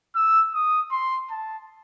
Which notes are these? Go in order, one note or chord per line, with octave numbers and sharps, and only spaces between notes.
E6
D#6
C6
A5